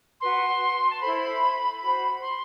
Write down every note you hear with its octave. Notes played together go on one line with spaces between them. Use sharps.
F#4 B4 C6
A5
E4 A4 C5 B5
F#4 C5 B5
C6